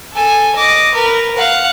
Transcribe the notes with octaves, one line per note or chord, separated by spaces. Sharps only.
A4 G#5
D#5 D6
A#4 B4
F5 F#5